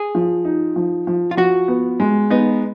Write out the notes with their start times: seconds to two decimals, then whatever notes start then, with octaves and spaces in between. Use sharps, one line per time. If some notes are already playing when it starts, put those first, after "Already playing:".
Already playing: G#4
0.15 F3
0.45 D#4
0.76 F3
1.07 F3
1.31 F4
1.37 F3 F#4
1.68 B3
2.00 G#3
2.30 B3 D#4